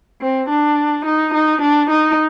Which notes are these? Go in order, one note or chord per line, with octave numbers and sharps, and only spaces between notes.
C4
D4
D#4
D#4
D4
D#4